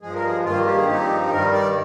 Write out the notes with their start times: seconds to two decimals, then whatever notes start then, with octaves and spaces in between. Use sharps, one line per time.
0.01 G2 F3 G#3 G#4
0.14 A#4
0.25 G#4
0.44 G2 D#3 A#3 F4
0.67 G4
0.76 G#4
0.85 G2 F3 C4 D#4 G4
1.31 G2 D#3 G3 A#4
1.53 D5